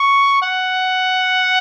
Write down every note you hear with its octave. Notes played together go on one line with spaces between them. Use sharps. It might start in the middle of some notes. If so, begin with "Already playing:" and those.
Already playing: C#6
F#5